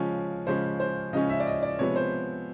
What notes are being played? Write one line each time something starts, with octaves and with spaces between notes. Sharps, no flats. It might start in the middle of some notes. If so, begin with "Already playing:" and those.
Already playing: C#3 F3 G#3 C#4
C#3 F3 G#3 C#4 C5
C5
C#3 F3 G#3 C#4 D#5
E5
D5
D#5
D5
C3 F3 G#3 B3 C#5
C5